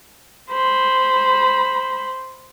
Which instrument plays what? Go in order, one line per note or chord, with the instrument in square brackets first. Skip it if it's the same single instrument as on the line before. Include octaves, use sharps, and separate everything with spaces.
[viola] C5 B5